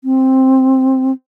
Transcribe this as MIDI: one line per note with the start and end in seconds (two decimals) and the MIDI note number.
0.04 1.12 60